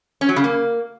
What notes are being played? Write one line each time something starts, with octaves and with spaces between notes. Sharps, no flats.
C#4
F#3
C#3
A#3